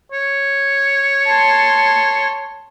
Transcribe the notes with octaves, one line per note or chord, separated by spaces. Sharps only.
C#5
A5 C6